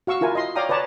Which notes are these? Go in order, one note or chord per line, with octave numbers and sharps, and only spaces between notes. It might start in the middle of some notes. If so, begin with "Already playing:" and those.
F#4 F5 C#6 E6
E4 F4 A#4 G#5
D#5 C6
C#5 D5 F5 G5 A#5 D#6
B4 C#5 D5 A5 A#5